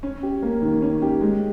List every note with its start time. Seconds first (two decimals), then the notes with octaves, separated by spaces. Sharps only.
0.03 C#4
0.23 G4
0.42 A#3
0.62 D#3
0.82 C#4
1.02 G4
1.21 G#3